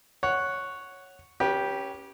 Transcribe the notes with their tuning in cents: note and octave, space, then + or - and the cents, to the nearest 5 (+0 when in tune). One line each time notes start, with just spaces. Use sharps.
C#5 +0 F#5 +0
C#4 +0 G4 +0 B4 -35